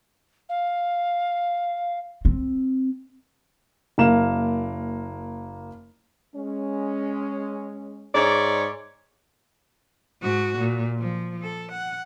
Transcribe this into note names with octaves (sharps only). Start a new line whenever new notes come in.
F5
C4
F#1 A#3 E7
G#3 C#4
G#2 C#5 D5
G#2 F#4
A#2
F3
A4
F#5